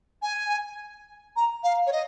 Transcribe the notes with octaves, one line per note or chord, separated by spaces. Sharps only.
G#5
A#5
F5
C#5
D#5